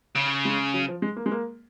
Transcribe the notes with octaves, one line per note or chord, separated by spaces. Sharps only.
C#3
G#3
F#3
F3
G#3
A#3
G#3
A#3